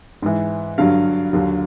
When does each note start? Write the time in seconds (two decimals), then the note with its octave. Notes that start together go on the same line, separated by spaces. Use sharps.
0.22 G#2 E3
0.78 G2 D3 F#3 F5
1.33 D#2 D3 F#3